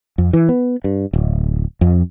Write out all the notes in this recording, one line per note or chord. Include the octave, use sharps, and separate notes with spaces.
F2
E3
B3
G2
D1
F2